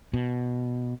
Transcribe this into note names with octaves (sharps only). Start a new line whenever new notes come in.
B2